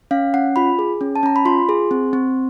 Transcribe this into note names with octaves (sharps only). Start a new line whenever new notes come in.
C#4 F5
C#4 F#5
F4 B5
G#4
C#4
A5
C#4 A#5
B5
F4 C6
G#4
C4
C4